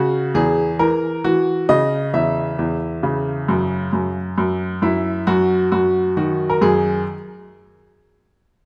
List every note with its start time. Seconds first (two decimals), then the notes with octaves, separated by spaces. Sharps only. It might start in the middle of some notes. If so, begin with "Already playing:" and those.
Already playing: C#3 F#4
0.34 E2 G#4
0.79 E3 A#4
1.24 E3 F#4
1.69 C#3 D#5
2.13 E2 E5
2.59 E2
3.03 C#3
3.48 F#2
3.93 F#2
4.38 F#2
4.82 F#2 E4
5.27 F#2 F#4
5.72 F#2 F#4
6.17 D#3 F#4
6.50 A#4
6.61 F#2 G#4